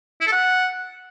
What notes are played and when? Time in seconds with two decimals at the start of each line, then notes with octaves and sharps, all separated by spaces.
0.21 E4
0.26 A4
0.32 F#5